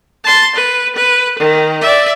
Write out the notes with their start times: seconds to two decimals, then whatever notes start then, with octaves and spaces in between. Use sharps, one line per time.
0.24 A5 C6
0.55 B4
0.96 B4
1.39 D#3
1.81 D5 E5